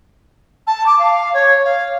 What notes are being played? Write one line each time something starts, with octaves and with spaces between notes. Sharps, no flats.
A5
D6
F5
C#5
F5